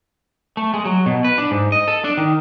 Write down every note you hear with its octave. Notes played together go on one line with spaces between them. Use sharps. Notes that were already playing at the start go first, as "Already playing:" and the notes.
A3
G#3
F#3
B2
B4
D4
G#2
D#5
A4
D4
D#3